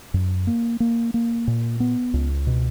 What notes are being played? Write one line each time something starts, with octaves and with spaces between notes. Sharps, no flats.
F#2
A#3
A#3
A#3
A#2
B3
C#2
B2